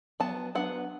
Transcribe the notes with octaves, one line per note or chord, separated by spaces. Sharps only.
F#3 B3 A5
F#3 B3 D4 F#5